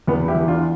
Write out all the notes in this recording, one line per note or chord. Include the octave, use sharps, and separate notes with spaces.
E2 B3
E4 G4
E3
D4 F4